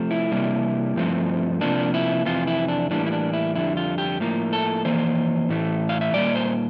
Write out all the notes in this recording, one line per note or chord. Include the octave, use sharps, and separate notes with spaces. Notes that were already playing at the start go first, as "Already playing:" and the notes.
Already playing: C3 F3 A3
E4
C3 G3 A#3
G2 F3 A3 C4
C3 F3 A#3 D4
E4
F2 C3 E3 F4
E4
D4
A2 E3 G3 A#3 D4
E4
D4
E4
F2 D3 G3 E4
F4
G4
A2 F3 A#3
A4
F2 E3 A#3 C5
A2 E3 A3
F5
E5
A#2 G3 A#3 D5
C5